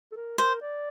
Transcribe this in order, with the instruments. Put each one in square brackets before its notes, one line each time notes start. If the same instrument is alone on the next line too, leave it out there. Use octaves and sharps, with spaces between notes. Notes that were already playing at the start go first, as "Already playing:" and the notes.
[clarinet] A4
A#4
[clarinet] A#4 [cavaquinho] C5
[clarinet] D5